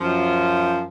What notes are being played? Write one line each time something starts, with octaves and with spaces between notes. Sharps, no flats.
F#2 F3